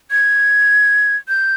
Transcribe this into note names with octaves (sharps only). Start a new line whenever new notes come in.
G#6
G6